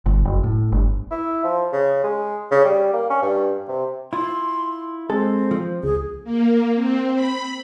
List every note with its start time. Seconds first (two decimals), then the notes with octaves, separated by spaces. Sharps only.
0.06 G1
0.25 F#1
0.44 A2
0.72 G1
1.11 E4
1.44 F3
1.72 C#3
2.04 G#3
2.51 C#3
2.65 G3
2.93 A#3
3.10 C#4
3.22 G2
3.68 C3
4.13 E4 F4 C6
5.10 G#3 C4 A4
5.51 F3
5.84 C#2 G#4
6.24 A#3
6.75 C4
7.15 B5